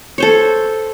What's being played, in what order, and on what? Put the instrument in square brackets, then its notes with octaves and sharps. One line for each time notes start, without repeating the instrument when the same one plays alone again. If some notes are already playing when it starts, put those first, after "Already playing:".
[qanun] A4 C5 C#5